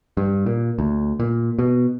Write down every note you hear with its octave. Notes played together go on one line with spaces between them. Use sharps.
G2
A#2
D2
A#2
B2